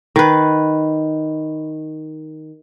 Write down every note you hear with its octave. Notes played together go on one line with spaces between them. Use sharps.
D#3 B4